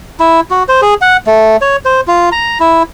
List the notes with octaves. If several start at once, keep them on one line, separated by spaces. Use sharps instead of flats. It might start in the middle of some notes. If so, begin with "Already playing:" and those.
E4
F#4
C5
G#4
F#5
A3
C#5
C5
F4
A#5
E4